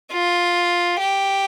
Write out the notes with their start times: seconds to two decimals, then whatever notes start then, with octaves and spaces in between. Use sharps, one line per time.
0.12 F4
0.99 G4